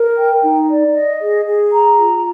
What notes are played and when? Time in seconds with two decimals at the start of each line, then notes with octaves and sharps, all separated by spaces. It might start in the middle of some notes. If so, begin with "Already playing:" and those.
Already playing: A#4
0.17 G5
0.43 D#4
0.68 D5
0.94 D#5
1.21 G#4
1.46 G#4
1.71 A#5
1.97 F4